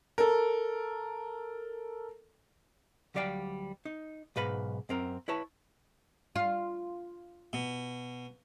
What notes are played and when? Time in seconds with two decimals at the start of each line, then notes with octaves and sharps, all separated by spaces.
0.18 A4 A#4
3.14 D2 F#3 G3 D5 F5 G5
3.85 D#4
4.36 B1 G#2 B4 F5 B5
4.89 F#2 C4 A#4
5.28 E4 B4 C#5 A5
6.35 F4
7.53 B2